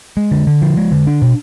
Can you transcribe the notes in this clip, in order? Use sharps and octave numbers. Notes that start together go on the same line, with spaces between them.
G#3
D3
D3
F3
G#3
D3
D4
B2